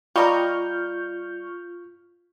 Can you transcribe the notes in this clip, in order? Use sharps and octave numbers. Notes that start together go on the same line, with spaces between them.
G3 F4 D#5 A#5 C#6 F6 G6